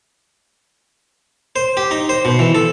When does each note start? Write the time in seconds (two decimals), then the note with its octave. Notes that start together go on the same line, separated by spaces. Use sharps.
1.56 C5
1.77 G4
1.91 D#4
2.09 C5
2.25 B2
2.39 E3
2.55 A4